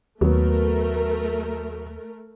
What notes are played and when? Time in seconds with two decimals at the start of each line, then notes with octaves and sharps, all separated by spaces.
0.21 D#2 F#3 A3 B3 A#4